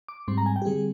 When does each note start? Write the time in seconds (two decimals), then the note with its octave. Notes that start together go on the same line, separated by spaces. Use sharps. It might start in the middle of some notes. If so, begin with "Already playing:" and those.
0.08 D6
0.28 G#2 G3 C4 C6
0.38 A#5
0.46 G#5
0.56 G5
0.62 G4
0.65 D3 G3 C4 G#4